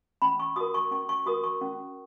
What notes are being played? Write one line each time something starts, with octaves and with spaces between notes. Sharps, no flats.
C#4 B5
C#6
F#4 A#4 D#6
C#6
C#4 C#6
C#6
F#4 A#4 D#6
C#6
C#4